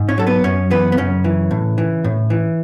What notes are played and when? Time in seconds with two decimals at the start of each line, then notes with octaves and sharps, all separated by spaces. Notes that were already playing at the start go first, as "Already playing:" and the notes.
Already playing: G#2
0.08 C#4 C#5
0.18 F#3 A4
0.27 B3 B4
0.44 F#2 C#4 C#5
0.70 E3 B3 B4
0.92 B3
0.97 F#2 C#3 C#4
1.24 E3
1.51 A2
1.78 E3
2.04 A2
2.30 E3